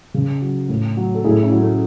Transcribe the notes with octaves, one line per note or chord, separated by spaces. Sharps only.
C#3
F#3
A2
F#3
A4
A2 E4 G#4
C#4 E4
F#3
A3 C#4